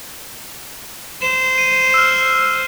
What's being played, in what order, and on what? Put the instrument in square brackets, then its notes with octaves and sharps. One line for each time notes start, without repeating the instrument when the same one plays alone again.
[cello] C5 [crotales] E7
[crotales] D#7
E6 F6